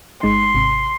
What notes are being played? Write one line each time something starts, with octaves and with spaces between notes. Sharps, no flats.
G1 G#3 D#4 C6
G#1 C3